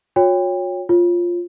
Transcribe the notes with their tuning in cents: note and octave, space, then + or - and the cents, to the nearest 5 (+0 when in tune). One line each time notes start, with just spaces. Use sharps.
F#4 -45 C#5 +0 G5 +30
F4 +0 C#5 -25